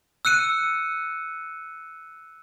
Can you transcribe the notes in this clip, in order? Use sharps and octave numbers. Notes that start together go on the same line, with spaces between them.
E6 F#6 C#7 D#7